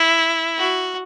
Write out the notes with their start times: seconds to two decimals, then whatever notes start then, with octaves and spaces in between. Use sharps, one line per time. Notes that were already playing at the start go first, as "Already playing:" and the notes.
Already playing: E4
0.58 F#4